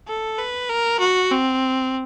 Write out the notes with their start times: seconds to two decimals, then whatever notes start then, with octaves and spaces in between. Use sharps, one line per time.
0.08 A4
0.39 B4
0.70 A#4
1.00 F#4
1.31 C4